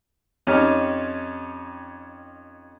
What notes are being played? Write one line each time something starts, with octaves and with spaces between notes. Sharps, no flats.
F2 C#4 D#4 G4 C#5 F6